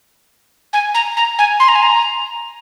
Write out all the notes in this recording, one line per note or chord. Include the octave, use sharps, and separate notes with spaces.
G#5
A#5
A#5
G#5
C6
A#5
G#5
A#5